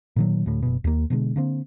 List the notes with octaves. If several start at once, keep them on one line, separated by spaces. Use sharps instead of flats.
A#2 D#3 F#3
D2 A2
F#1 B2
D#2 A#3
B2 D3 F3 G#3
D3 A#3 C4